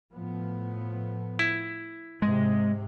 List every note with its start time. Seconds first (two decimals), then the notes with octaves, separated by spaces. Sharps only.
0.13 A2 F3 B3
1.39 E4
2.22 G#2 C3 G#3